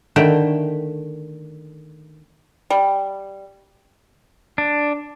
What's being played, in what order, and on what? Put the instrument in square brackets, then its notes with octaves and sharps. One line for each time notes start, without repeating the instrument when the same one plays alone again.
[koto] D3 D#3 A3 B4 E5 G5
[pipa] G3
[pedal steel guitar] D4